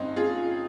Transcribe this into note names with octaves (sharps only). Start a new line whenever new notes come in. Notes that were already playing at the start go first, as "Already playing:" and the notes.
Already playing: G1 G2 C4 C#4 D#4
F4 G#4